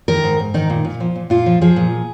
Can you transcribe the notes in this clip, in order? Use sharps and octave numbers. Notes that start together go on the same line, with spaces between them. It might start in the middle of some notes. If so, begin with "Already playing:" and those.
D#3 A#4
G#2
G#2
D#3 D#4
A#2
A#2
F3
A#2
A#2 F4
F3
F3 G#4
A#2